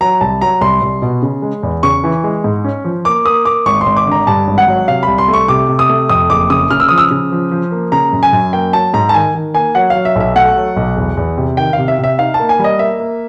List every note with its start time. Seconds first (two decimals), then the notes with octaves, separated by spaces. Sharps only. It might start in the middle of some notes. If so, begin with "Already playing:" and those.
0.01 F#3 A#5
0.21 C2 A5
0.41 F#3 A#5
0.61 C2 C6
0.82 C2
1.02 B2
1.22 C#3
1.42 G#3
1.63 E2
1.83 C#3 C#6
2.04 E3
2.24 G#3
2.44 G#2
2.64 C#4
2.84 F3
3.05 A#3 D6
3.25 A#3 D#6
3.45 A#3 D6
3.66 G#1 C#6
3.81 C6
3.86 G#1
3.96 D6
4.06 D3
4.12 A#5
4.27 G2 A5
4.47 G#1
4.58 F#5
4.68 F#3
4.88 C3 F5
5.03 C2 B5
5.18 C6
5.28 A3
5.33 C#6
5.48 C3 D6
5.69 C3
5.79 D#6
5.89 A3
6.09 F2 D#6
6.30 F#1 D6
6.50 C#3 D#6
6.71 C#3 F6
6.80 E6
6.89 F3 D#6
6.98 E6
7.11 C#3
7.32 F3
7.51 F3
7.72 A#3
7.92 C#3 A#5
8.13 F#2
8.23 G#5
8.33 F#2
8.53 A#3 G5
8.73 F#3 A5
8.94 G#2 A#5
9.09 A5
9.14 D#3 G#5
9.35 D#3
9.55 A#3 G#5
9.75 F#3 F#5
9.90 F#3 F5
10.05 E5
10.16 B1 E5
10.36 A3 F#5
10.56 F#3
10.77 B1
10.97 E2
11.17 E2
11.38 C3
11.57 D#3 G5
11.73 C3 F5
11.88 E5
11.99 C3
12.04 E5
12.19 D#4 F5
12.34 A5
12.39 A#3
12.49 G#5
12.59 G3
12.64 D#5
12.79 A#3 E5
13.00 A#3